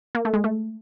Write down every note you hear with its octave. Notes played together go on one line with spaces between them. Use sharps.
A#3
A3
G#3
A3